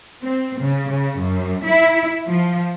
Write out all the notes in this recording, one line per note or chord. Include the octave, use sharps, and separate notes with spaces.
C4
C#3
C#3
F#2
E4
F3